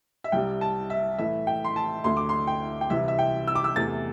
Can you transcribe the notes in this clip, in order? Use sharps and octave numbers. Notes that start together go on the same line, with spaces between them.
E5
C2 C3 G3 G5
A5
E5
A2 E3 A3 E5
G5
C6
A5
D2 D3 A3 C6
D6
C6
G5
G5
C2 C3 E3 E5
E5
G5
E6
D6
E6
E2 C3 A3 A6